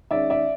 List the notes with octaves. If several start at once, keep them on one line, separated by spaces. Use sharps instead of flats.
D#3 G#3 C#4 D5 E5
D5 E5